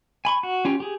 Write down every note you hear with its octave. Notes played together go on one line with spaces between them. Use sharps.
G#5 B5 C#6
F#4
C#4 F4 G4 G5
G4 G#4